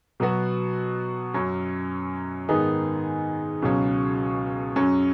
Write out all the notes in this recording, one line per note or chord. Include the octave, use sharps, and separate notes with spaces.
B2 F#3 B3 F#4
F#2 F#3 C#4
G#2 D#3 B3 D#4 G#4
C#2 B2 F#3 C#4
F#2 F#3 C#4